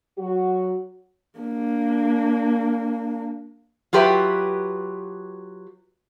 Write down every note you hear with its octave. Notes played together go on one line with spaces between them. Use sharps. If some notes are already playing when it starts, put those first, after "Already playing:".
F#3 F#4
A#3 D4
F#3 F4 G4 B4 E5